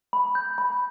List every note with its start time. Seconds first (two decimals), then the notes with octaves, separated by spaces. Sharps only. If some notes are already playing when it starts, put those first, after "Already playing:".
0.13 B5
0.35 G6
0.58 B5